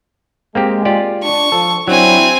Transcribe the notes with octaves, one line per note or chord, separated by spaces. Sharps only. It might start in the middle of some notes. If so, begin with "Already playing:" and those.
G#3 A#3 C4 G4
F4 G4 D5
D4 C#6
F3 A4
F#3 C4 D4 E4 G#5